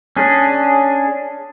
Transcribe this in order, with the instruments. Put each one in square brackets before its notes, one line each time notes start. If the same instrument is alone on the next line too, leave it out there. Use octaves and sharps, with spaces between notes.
[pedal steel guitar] C#4 D4 G#4